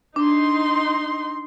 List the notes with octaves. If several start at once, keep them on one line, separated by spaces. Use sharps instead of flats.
D4 D#4 C6